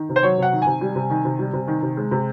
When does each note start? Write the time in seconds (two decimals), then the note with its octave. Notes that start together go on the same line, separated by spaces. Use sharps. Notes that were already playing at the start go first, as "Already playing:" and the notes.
Already playing: D#3
0.09 C3
0.16 C5
0.23 F#3 C#5
0.38 C3 F#5
0.52 D#3
0.62 C3 G#5
0.81 G3
0.95 C3
1.10 D#3
1.24 C3
1.39 G3
1.53 C3
1.68 D#3
1.82 C3
1.97 G#3
2.11 C3